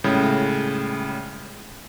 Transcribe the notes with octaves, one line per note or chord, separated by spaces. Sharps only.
A2 C#3 G3 G#3